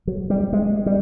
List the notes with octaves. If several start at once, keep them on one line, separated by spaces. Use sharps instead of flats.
F#3
G3
G#3
G3